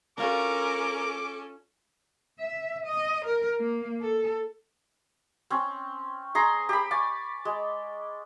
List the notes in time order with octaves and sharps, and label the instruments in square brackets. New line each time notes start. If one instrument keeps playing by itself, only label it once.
[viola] C#4 A4 [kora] D4 F4 F#4 [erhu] A#4 [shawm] D6
[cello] E5
D#5
A#4
A#3
A4
[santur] C4 C#4
G#4 A#5 C6
G4 B5
D5 G#5 C#6
G#3